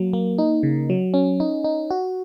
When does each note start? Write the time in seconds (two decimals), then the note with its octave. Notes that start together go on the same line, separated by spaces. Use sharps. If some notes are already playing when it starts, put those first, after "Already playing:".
Already playing: F#3 A#3
0.13 A#3
0.38 D#4
0.63 C#3
0.90 F#3
1.14 C#4
1.40 D#4
1.64 D#4
1.91 F#4